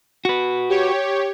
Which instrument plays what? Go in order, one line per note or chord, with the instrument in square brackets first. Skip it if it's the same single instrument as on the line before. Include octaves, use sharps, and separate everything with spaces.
[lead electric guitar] F#4 B4
[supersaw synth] G4 C#5